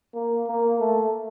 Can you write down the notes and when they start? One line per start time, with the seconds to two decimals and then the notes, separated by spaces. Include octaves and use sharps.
0.14 A#3
0.47 A#3
0.80 A3